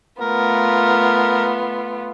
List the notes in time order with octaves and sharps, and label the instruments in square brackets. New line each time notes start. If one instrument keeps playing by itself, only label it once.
[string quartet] A3 B3 F4 [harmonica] A#4